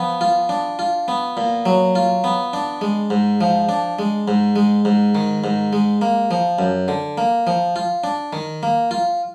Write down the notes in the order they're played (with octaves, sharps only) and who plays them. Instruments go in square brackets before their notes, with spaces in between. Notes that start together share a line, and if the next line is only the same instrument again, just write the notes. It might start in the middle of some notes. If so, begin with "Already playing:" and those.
Already playing: [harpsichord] F3 B3
F4
D4
F4
B3
A#2
F#3
F4
B3
D4
G#3
G#2
F3
D4
G#3
G#2
G#3
G#2
D#3
G#2
G#3
A#3
F3
F#2
D3
A#3
F3
F4
D4
D#3
A#3
F4